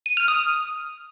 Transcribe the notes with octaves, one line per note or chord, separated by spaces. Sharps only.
D#7
F6
D#6